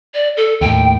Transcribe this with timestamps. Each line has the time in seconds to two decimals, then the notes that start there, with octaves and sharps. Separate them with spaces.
0.14 D5
0.37 A4
0.61 D#2 A2 G5